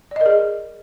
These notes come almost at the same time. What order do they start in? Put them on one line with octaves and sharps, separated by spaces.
D5 D#5 A#4 G#4